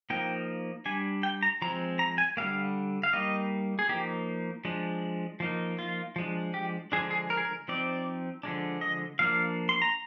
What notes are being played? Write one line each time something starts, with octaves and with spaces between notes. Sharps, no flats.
F3 A#3 D#4 G5
G3 D4 G#5
G5
A#5
F3 G#3 C4 A#5
A#5
G#5
D3 G3 A#3 F5
F5
G3 A#3 D#4 D#5
G#4
F3 A#3 D#4 G4
F3 G#3 D4
F3 A#3 D#4
F4
F3 G#3 D4
G4
D3 F3 G#3 D4 G#4
G#4
A#4
G#4
A#4
F3 C4 D#4 D5
D3 F3 G#3 D4
D#5
F3 A#3 D4 F5
C6
A#5